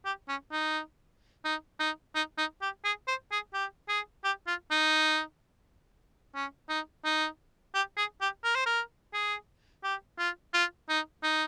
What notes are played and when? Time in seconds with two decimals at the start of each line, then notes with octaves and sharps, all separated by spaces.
0.05 G4
0.28 C#4
0.51 D#4
1.44 D#4
1.79 D#4
2.15 D#4
2.38 D#4
2.62 G4
2.85 G#4
3.07 C5
3.32 G#4
3.54 G4
3.89 G#4
4.24 G4
4.47 F4
4.71 D#4
6.35 C#4
6.69 D#4
7.05 D#4
7.74 G4
7.97 G#4
8.21 G4
8.44 A#4
8.55 C5
8.66 A#4
9.13 G#4
9.84 G4
10.19 F4
10.54 F4
10.89 D#4
11.23 D#4